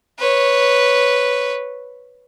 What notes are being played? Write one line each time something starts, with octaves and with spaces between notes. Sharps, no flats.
B4 C#5